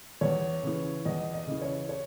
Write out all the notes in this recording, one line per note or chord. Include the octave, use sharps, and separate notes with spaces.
E2 C#5
C#3 E3
E2 D#5
D#5
C#3 E3
C#5
C#5